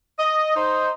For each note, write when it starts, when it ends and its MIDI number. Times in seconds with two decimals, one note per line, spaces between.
0.19 0.53 75
0.56 0.90 63
0.56 0.90 72